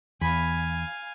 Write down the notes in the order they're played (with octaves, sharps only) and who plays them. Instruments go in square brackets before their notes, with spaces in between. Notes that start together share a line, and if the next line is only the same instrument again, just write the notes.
[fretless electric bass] E2 [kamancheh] F5 G#5 [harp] B5